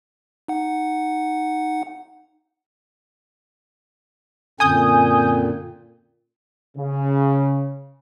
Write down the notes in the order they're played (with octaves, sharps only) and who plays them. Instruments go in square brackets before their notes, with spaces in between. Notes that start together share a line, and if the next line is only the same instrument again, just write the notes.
[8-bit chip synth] D#4 F#5
[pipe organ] F#2 D3 C4 [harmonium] A#2 [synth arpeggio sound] G#5 D#6 G6
[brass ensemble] C#3